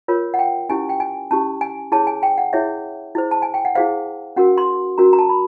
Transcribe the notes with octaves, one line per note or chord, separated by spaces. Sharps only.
F4 A#4 C#5
F#5
G5
C#4 E4 G4 G#5
G5
G#5
C#4 E4 G4 A5
G#5
E4 G#4 C#5 A5
G#5
G5
F#5
E4 G#4 C#5 E5
E4 G#4 C5
A5
G#5
G5
F#5
E4 G#4 C5 F5
C#4 F#4 A#4 F#5
C6
C#4 F#4 A#4 A#5
A#5
A5
B5